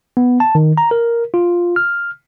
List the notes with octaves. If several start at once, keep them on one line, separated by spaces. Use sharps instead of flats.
B3
A5
D#3
A#5
A#4
F4
F6